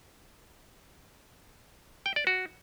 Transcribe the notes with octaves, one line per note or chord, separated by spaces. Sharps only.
G5
D5
F#4